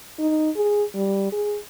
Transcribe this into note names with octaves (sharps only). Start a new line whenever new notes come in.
D#4
G#4
G3
G#4